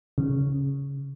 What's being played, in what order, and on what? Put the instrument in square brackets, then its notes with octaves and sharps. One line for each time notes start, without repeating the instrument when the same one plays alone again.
[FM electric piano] C#3